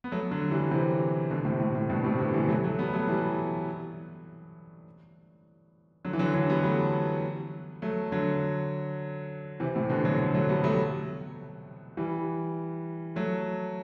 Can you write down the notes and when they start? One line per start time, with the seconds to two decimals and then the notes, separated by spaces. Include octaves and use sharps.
0.04 B3
0.12 F#3 A3
0.31 D3 F#3
0.51 E3 G3
0.71 C3 E3
1.30 B2 D3
1.45 A2 C3
1.60 A2
1.75 A2
1.89 G2 B2
2.04 A2 C3
2.19 B2 D3
2.34 E3 G3
2.48 F#3 A3
2.64 F#3 A3
2.79 G3 B3
2.93 F#3 A3
3.08 E3 G3
6.05 D3 F#3
6.13 E3
6.19 D3 F#3
6.34 D3 F#3
6.49 G3 B3
6.64 F#3 A3
7.82 F#3 A3
8.12 D3 F#3
9.60 C3 E3
9.75 A2 C3
9.90 B2 D3
10.05 D3 F#3
10.19 D3 F#3
10.34 F#3 A3
10.49 G3 B3
10.64 F#3 A3
11.97 E3 G3
13.16 F#3 A3